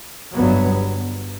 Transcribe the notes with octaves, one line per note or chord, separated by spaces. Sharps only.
G1 G2 F#3 B3